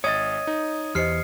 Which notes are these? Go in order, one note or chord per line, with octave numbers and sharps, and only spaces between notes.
G#1 C#5 D#5 D#6 G#6 A6 D#7
D#4
E2 G4 C5 D#5 F6 C7 C#7